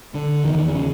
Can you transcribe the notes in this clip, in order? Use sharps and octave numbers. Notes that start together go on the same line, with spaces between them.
D3
E2 D#3
C#3